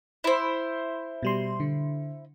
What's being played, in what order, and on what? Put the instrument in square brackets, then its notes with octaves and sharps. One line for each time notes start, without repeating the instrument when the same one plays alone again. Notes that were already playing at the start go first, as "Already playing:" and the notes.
[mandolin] E4 C5
[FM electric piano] B2 G3 C6
D3